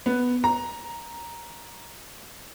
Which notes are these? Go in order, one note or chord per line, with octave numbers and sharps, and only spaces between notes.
B3
A#5